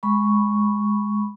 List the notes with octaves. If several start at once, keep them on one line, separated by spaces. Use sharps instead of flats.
G#3 B5 C#6